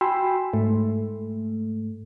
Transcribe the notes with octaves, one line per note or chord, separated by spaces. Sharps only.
F#4 G5 G#5 B5 C6 E6
G#2 A3